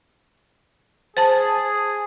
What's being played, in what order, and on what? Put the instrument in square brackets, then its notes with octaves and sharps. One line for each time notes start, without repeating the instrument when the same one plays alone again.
[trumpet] G#4 [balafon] C5 A5